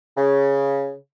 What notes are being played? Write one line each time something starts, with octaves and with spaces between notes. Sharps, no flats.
C#3